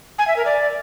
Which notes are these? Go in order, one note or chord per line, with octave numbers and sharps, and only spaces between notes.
G#5
E5
A#4
D5